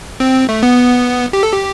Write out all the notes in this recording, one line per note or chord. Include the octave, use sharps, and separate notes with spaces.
C4
A3
B3
G4
A4
G4